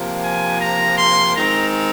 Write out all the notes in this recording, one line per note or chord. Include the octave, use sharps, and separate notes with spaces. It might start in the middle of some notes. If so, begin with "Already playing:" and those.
Already playing: C3 F3 A#3
G#5
A#5
C6
D#3 G#3 C4 A#5